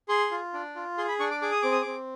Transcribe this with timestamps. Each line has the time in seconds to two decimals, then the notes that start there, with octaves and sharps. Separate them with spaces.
0.09 G#4 C6
0.31 F4
0.54 D4
0.75 F4
0.98 G#4 C6
1.08 B5
1.19 D4 C#6
1.31 D6
1.42 G#4 D6
1.51 D#6
1.62 C4 D6
1.72 D#6
1.82 C4 D6